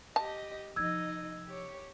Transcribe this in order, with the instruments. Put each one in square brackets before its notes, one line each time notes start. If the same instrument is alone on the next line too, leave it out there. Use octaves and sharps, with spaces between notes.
[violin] G4 D#5 [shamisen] A5
[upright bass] C3 F3 [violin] D#4 D#5 [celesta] E6 G#6
[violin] G4 C#5